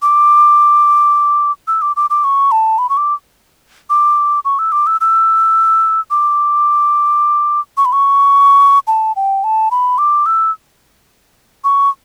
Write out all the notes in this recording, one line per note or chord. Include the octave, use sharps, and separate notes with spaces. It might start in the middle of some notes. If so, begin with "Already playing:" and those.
D6
E6
D6
D6
D6
C#6
A5
B5
C#6
D6
D6
C#6
E6
D6
E6
E6
D6
C#6
B5
C#6
A5
G5
A5
B5
D6
E6
C#6